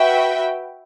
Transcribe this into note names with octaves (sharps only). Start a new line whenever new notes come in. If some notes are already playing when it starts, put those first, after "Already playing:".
Already playing: F#4 B4 E5 G5